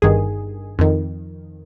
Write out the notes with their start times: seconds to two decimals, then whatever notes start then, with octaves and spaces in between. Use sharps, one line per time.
0.02 G1 G2 D#3 G#4
0.79 F2 D#3